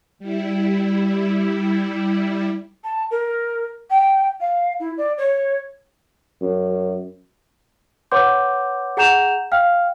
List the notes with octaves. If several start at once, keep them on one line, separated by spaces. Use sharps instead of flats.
G3 E4
A5
A#4
G5
F5
E4
D5
C#5
F#2
B4 C#5 F#5 C6 D6 G6
G#4 F#5 A#5 G6 E7 F7
F5 G5 F6